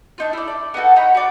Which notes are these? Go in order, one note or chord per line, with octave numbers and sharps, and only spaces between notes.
D4 D#4 F4
E4 D5
D5
B3 D#4 F#4 A4
D#4 A#5 B5 C#6
F#4 D5